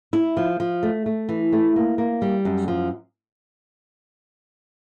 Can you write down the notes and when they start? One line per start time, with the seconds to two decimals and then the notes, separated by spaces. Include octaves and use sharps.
0.13 E4
0.37 F3
0.60 F3
0.83 A3
1.06 A3
1.29 E3
1.52 A3
1.76 A#3
1.98 A#3
2.22 G3
2.45 F#2
2.68 F3